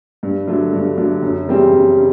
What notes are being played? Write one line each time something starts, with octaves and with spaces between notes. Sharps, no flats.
G2
D3 F#3 A3
G2
D3 F#3 A3
F#2
C#3 E3 G3 C4
F#2
C#3